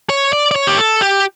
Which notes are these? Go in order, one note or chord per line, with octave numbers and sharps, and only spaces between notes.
C#5
D5
D5
C#5
G4
A4
G4